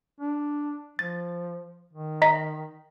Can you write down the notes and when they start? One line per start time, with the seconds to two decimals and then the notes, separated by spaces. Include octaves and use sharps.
0.20 D4
0.99 F3 A6
1.93 D#3
2.22 D#5 A#5 B6